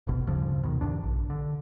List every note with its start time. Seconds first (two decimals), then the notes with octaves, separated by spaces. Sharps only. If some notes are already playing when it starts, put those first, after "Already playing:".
0.07 D1 G1 B2
0.27 D2 G2 C#3 F3
0.63 B2 D#3
0.81 C2 G2 D4
1.03 A#1
1.30 D3